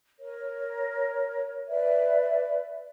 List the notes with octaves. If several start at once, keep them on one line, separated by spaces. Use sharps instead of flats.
A#4 C#5
B4 D5 E5